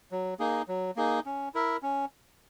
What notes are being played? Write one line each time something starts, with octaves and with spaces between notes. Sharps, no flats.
F#3
A#3 D#4 G#4
F#3
A#3 D#4 G#4
C#4
E4 A#4 E5
C#4